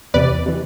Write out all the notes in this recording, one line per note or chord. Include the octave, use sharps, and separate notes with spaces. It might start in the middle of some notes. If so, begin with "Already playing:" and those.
E2 C3 E3 B4 D5
C3 E3